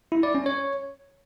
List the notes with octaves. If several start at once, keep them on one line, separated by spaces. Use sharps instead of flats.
E4
D5
C#4
C#5